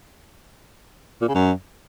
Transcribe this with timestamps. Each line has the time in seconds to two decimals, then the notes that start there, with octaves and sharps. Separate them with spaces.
1.22 A#2
1.28 C#3
1.35 F#2